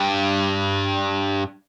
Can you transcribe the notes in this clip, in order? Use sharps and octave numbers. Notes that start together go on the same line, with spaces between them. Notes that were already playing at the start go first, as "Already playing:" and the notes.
Already playing: G2